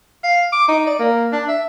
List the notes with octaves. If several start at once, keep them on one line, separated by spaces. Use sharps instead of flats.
F5
D6
D#4
D5
A#3
D4
E5